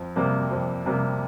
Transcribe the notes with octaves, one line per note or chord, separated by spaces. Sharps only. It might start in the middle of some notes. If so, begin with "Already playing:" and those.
Already playing: F2
C3 G3 A#3
F2
C3 G3 A#3